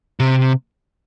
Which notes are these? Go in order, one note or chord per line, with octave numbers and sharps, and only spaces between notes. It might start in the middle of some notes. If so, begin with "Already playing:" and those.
C3